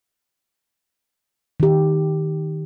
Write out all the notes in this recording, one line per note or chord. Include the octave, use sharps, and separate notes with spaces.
D#3 G4